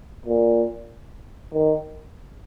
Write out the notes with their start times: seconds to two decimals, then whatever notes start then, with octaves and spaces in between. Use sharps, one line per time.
0.26 A#2
1.54 D#3